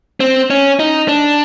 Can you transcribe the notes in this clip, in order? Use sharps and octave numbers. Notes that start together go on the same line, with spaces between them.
C4
C#4
D#4
D4